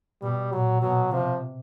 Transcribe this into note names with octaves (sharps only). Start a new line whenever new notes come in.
B2 G3
A#2 F#3
B2 F#3
C3 F3